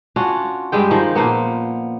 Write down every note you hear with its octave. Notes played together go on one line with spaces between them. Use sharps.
C#4 D4 F4 F#4
G2 G3 G#3 G5
D#3 F3
A#2 F3 A#3 B3